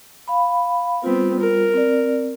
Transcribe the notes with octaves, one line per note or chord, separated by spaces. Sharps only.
F5 B5
G3 B3 C4 F4
A#4
C4 D5